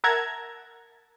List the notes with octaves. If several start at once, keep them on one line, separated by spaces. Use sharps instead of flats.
A#4 E5 F#5 A5 A#5 G#6